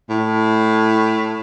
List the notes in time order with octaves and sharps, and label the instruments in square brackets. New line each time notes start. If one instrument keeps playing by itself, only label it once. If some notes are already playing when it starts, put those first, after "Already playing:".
[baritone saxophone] A2